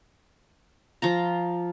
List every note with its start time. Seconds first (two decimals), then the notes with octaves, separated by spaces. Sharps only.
1.02 F3 F4 A#5